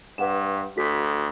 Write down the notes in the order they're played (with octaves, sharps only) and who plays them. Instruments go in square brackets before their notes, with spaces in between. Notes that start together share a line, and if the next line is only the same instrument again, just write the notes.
[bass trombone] G2 [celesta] B4 F#5 E7
[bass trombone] D2 [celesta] F#4 A4 B6